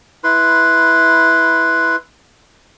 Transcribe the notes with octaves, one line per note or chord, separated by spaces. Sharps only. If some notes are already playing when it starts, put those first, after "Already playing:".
E4 B4 C6